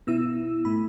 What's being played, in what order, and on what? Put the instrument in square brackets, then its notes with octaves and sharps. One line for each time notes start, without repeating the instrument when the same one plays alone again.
[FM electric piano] B2 B3 E4 E6
A2 A3 E4 B5